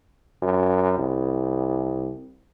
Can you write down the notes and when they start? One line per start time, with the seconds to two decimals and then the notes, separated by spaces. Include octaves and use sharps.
0.43 F#2
0.98 C2